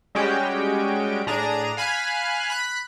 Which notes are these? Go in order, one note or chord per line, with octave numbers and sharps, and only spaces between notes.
G3 G#3 C#4 F#4 G4 G5
A2 D4 G#4 A#5 D#7
F5 G#5 B5 F6 F#6
B5 F#6